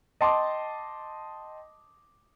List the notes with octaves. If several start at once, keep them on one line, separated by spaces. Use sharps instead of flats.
D#5 G5 A5 C6 D6